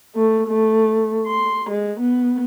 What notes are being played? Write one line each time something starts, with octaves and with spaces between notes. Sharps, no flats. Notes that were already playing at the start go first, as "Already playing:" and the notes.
A3
A3
C6
G#3
B3